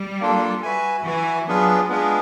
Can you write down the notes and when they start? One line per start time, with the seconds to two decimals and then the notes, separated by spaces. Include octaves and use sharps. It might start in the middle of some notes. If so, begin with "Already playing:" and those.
Already playing: G3
0.20 A#3 D4 F4 A4
0.63 F#4 B4 E5 G#5
1.05 E3 F#4 B4 E5 G#5
1.47 F#3 B3 D4 F4 G#4 B4
1.89 G#3 B3 D4 F4 G#4 B4